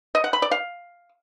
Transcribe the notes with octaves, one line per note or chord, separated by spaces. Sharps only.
D#5
F#5
B5
D5
F5